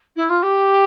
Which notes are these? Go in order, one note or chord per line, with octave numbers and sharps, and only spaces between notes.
E4
F4
G4